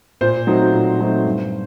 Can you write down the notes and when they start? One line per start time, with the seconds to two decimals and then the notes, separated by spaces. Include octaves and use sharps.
0.21 A#2 C5
0.47 F#3 A3 C4 D#4
0.73 A#2
1.00 F#3 A3 C4 D#4
1.25 G2